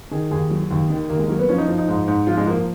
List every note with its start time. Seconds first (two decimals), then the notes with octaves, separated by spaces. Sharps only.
0.11 D#3 G#4
0.31 D#2 G#4
0.50 F#3
0.71 D#2
0.90 D#3
1.09 D#2 A#3
1.19 G#3
1.29 F#3 A#3
1.39 B3
1.49 F3 C#4
1.58 D#4
1.68 F3
1.78 D#4
1.88 G#2
2.08 G#2
2.27 F3 F4
2.37 G#3
2.47 F3 A#3